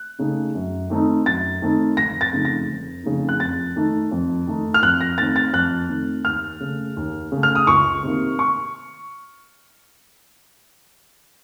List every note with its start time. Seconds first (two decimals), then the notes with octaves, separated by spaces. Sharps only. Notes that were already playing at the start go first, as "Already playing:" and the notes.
Already playing: F#6
0.19 C#3 A3 D#4
0.55 F#2
0.90 D#3 A3 C4 D#4
1.26 F#2 A6
1.62 D#3 A3 C4 D#4
1.97 F1 A#6
2.21 A6
2.32 F2 C#3 A3 D#4
2.45 A#6
2.68 F1
3.04 F2 C#3 A3 D#4
3.29 F#6
3.40 F2 A6
3.76 D#3 A3 D#4
4.11 F2
4.47 D#3 A3 D#4
4.74 F6
4.82 F2 F#6
5.01 A#6
5.18 D#3 A3 C4 A6
5.36 A6
5.53 F2 F#6
5.89 D#3 A3 C4
6.25 D#2 F6
6.60 C#3 A3
6.97 D#2
7.32 C#3 A3
7.43 F6
7.55 D#6
7.67 C#2 C#6
8.03 C3 D#3 A#3
8.39 C#6